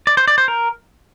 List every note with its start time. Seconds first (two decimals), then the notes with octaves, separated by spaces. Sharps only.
0.07 D5
0.17 C5
0.28 D5
0.38 C5
0.48 A#4